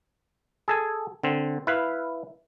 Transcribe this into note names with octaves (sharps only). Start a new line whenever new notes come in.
G#4 A4 G#5
D3 C4
E4 B4 F5